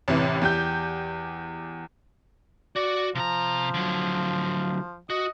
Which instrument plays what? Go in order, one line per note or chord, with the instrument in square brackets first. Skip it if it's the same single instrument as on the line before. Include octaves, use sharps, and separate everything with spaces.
[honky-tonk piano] A1 C3 E3
E2 G4 G6
[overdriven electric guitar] F#4 [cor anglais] D5
[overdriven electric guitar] C3 A#5 [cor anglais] F3
[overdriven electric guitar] D3 F#3
[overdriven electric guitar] F#4 [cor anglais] D#5